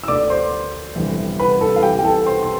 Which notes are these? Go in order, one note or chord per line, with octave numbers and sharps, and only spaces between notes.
E6
D2 D3 D5 D6
C5 C6
G1 F2 C3 E3
B4 B5
A4 A5
F5
C2 C3 E3 G4 G5
G5
A4 A5
C5 C6
C6